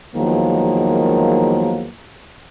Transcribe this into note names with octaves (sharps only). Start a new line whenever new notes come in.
E2 D#3 F3 F#3 G#3 A#3